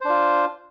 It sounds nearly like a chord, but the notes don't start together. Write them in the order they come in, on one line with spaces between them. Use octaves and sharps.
C5 D4 F4